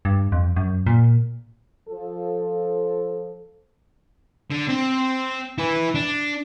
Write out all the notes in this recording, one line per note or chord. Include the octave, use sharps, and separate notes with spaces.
G2
F2
F#2
A#2
F3 A4
D3
C4
E4 B4
D4